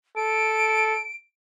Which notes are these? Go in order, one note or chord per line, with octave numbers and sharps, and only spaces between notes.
A4 D7